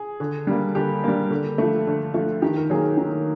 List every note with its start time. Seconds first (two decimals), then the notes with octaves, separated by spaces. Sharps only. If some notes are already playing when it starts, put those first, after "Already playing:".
Already playing: G#4
0.20 D3
0.47 G3 A#3
0.75 D3 G4
1.04 G3 A#3
1.31 D3
1.58 F3 A3
1.87 D3
2.14 F3 A3
2.42 D#3 G4
2.57 A#4
2.70 F#3 A#3 G#4
2.97 D#3